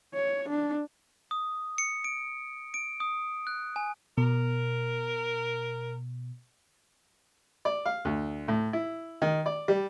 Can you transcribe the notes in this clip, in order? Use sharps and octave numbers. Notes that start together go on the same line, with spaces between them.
C#5
D4
D#6
C#7
D7
D7
D#6
F#6
G#5
B2 A#4
D5
F5
D2
A2
E4
D#3
D5
G3